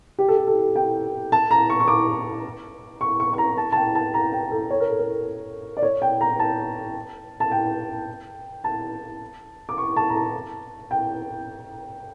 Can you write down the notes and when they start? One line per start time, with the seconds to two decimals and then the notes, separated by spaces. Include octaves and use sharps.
0.19 G4
0.28 A4
0.38 G4
0.47 A4
0.76 G5
1.32 A5
1.51 A#5
1.70 C#6
1.80 C#6
1.88 D6
3.01 C#6
3.20 C#6
3.33 C#6
3.38 A#5
3.58 A5
3.72 A5
3.76 G5
3.95 A5
4.14 A#5
4.32 G5
4.51 A4
4.71 C#5
4.80 A#4
4.90 A4
4.99 A#4
5.77 D5
5.83 C#5
6.02 G5
6.21 A#5
6.39 A5
7.40 A5
7.52 G5
8.64 A5
9.69 D6
9.78 C#6
9.96 A5
10.10 A#5
10.16 A5
10.91 G5